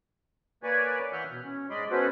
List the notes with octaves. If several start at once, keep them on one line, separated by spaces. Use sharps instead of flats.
A#3 B4 C#5 D5 G#5
E3 E5 F#5 F6 G6
B2
C#4
G#2 G#3 D5 D#5 B5 C6
B3 C#4 F#4 A4 B4 C5